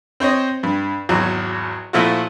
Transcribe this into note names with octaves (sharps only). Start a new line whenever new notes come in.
C4 C5 C#5 D#5
G2
G#1 E2 F#3
A#2 F3 A3 E4 F#4